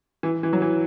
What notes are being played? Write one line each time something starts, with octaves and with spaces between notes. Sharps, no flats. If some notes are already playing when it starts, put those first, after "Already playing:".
E3
E3
F#3
E3